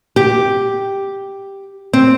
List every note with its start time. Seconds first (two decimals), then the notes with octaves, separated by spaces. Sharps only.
0.16 G4
1.93 C4